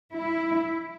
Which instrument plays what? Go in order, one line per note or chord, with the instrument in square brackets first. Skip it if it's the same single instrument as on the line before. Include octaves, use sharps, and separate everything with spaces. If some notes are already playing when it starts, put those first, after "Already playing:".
[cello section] E4